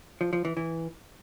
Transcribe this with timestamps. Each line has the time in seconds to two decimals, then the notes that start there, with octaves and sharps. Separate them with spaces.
0.21 F3
0.33 F3
0.45 E3
0.57 E3